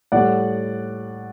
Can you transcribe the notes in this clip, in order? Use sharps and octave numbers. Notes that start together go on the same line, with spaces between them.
A2 G3 D5 F#5